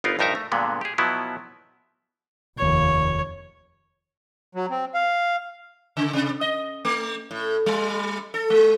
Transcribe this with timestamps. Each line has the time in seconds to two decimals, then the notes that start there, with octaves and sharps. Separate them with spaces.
0.04 G1 B3 D#4 F4 A#4
0.19 A#1 G2 D#4 A#4 E5 A#5
0.35 A3
0.52 G2 A#2 D3 G#3 B3
0.81 G4 G#4
0.98 B2 F3 F#3 B3 E4
2.58 F1 D#2 C#5
4.55 F#3
4.70 C4
4.94 F5
5.97 C#3
6.13 C3
6.41 D#5
6.85 A3
7.31 A2
7.66 G3
8.34 A4
8.50 G#3